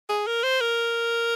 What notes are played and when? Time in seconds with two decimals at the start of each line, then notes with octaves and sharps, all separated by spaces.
0.09 G#4
0.27 A#4
0.43 C5
0.60 A#4